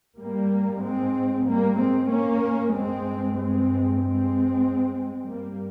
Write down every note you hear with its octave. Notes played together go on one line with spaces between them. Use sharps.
G#2 G3 A#3
G#3 C4
G3 A#3
G#3 C4
A#3 C#4
G2 G#3 C4
G#3 C4
G#3 C4
G2 G3 A#3